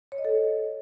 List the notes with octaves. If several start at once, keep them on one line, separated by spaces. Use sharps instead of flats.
C#5
D#5
A4